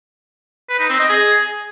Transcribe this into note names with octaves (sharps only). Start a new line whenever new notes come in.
B4
D#4
C4
D#5
G#4